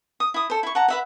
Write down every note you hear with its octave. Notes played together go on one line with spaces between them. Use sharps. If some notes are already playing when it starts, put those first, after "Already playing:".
D#6
E4 D#6
A4 C5
E4 C#6
F#5 A5 A#5
B4 E5 F#5